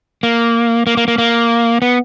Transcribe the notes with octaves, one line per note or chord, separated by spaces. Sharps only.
A#3
A#3
A#3
A#3
A#3
B3